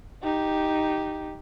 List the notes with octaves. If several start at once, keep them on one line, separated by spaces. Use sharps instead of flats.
D#4 G4